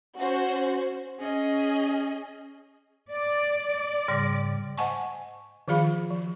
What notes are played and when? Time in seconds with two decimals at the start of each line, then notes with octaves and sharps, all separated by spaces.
0.16 C#4 F#4 C5
1.20 C#4 G#4 D#5
3.10 D5
4.08 G#2 C#3 G3
4.78 C5 D#5 F#5 G#5 A5 C#6
5.68 D#3 F3 F4 G#4 F5 B5
6.10 F3